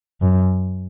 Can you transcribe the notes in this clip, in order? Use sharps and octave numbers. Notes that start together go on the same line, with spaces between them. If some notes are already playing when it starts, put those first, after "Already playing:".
F#2